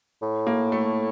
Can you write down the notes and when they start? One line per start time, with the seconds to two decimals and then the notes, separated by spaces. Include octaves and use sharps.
0.22 A2
0.47 A#3
0.72 A3